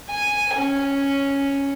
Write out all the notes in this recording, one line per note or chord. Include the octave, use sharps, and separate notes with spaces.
G#5
C#4